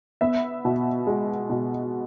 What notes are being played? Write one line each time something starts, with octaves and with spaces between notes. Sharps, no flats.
B3 E5
B2
G#3
B2